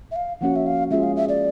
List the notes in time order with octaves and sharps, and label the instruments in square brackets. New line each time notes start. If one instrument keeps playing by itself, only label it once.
[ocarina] E5
F5
[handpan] F3 A#3 C#4 F#4 [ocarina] F#5
[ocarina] E5
F5
[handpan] G#3 C#4 F4 G#4 [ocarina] E5
[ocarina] F5
E5
D5